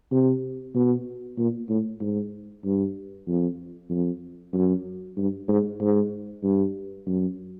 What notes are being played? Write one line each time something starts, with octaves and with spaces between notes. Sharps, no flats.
C3
B2
A#2
A2
G#2
G2
F2
F2
F#2
G2
G#2
G#2
G2
F#2